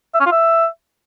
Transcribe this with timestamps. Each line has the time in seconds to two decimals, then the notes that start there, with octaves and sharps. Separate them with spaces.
0.15 E5
0.20 C#4
0.26 F4
0.32 E5